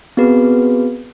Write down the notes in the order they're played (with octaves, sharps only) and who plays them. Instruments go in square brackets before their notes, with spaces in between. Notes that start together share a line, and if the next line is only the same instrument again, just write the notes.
[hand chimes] B3 C4 F#4 G#4 B4